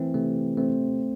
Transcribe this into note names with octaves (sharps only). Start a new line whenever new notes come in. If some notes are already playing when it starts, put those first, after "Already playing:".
Already playing: E3 A3 C4
C3 A3
A3 C4